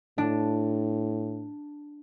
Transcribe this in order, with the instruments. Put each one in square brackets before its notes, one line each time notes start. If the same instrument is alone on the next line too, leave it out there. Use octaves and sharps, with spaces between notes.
[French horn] A2 [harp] D4